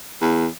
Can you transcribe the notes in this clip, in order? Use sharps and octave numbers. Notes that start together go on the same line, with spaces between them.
E2